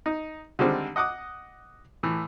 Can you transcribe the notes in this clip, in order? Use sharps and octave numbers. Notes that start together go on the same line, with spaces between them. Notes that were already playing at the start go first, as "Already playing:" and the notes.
D#4
D3 D#3 G3 G#3 C4
D#5 F#5 D6 D#6
A2 E3